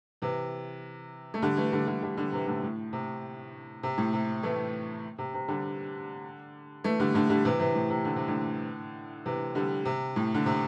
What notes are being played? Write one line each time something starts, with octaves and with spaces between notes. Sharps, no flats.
C3 E3
A3
D3 G3
E3 A3
D3 G3
D3 G3
D3 G3
D3 G3
C3 E3
A2 D3
A2
C3
C3
A2
C3
E3 A3
C3
C3
D3 G3
E3 A3
D3 G3
A2 D3
D3 G3
C3 E3
C3 E3
A2
C3
D3
C3
A2 D3
C3 E3
D3 G3
C3
A2
D3
C3